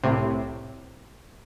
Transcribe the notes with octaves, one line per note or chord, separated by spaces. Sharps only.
C2 A2 C3